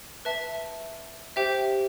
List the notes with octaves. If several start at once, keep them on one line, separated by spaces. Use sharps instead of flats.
B4 E5 A5
G4 C5 E5 G5